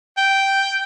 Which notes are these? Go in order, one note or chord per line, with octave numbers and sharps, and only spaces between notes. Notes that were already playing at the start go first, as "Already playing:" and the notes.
G5